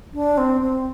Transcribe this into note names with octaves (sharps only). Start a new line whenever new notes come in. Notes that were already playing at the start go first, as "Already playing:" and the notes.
D4
C4
C4